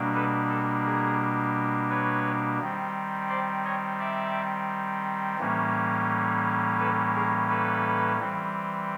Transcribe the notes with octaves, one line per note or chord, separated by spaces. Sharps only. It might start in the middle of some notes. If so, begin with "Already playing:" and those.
Already playing: B2 G3 A#3 D4
A4 B4
A4
G#4 A#4
B4 C#5
D#3 G3 C4
C5 D5
C#5 D#5
D5 E5
A2 E3 G3 A#3 C#4
A4 B4
G#4 A#4
A4 B4
E3 G3 C4